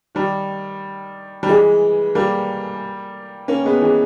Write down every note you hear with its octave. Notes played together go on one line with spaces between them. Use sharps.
D#3 G3
G3
E3 G#3
G3 A#3
A#3 C#4
G#3 B3
E3 G#3